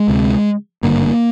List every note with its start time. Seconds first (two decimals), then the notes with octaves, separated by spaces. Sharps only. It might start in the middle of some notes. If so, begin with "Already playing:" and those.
Already playing: G#3
0.08 D2 C3
0.83 G#1 G2 D3 A#3